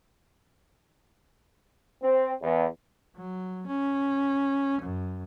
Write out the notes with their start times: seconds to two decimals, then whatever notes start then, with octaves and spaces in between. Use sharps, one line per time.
2.02 C4
2.42 E2
3.16 F#3
3.67 C#4
4.82 F#2